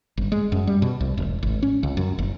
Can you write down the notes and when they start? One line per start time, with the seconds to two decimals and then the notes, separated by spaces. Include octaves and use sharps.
0.17 G1
0.32 G#3
0.52 F#2
0.67 G3
0.82 B2
1.00 C2
1.17 E1
1.43 G#1
1.63 C#4
1.83 C#2
1.97 F#2
2.19 F#1